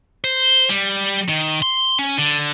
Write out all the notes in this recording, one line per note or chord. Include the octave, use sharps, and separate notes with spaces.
C5
G3
D#3
C6
C#4
D3